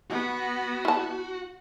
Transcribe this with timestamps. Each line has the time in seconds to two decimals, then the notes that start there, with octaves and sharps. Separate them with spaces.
0.10 B3 F#4
0.85 E4 A5